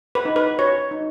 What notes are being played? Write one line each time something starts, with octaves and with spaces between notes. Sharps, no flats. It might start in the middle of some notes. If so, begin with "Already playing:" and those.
B4
D#4
B4
F#4 C#5
D#4